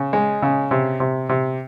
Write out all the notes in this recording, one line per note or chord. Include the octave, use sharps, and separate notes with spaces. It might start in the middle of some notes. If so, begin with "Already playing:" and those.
Already playing: C#3
G#3
C#3
C3
C3
C3